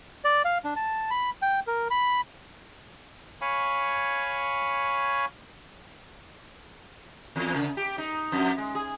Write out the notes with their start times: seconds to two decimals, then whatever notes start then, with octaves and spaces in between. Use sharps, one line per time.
0.24 D5
0.45 F5
0.65 D4
0.76 A5
1.10 B5
1.42 G5
1.67 A#4
1.90 B5
3.41 C#5 F5 G#5 B5 C#6
7.36 E2
7.56 C#3
7.77 G4
7.98 D#4
8.32 F2
8.58 G#3
8.75 G#4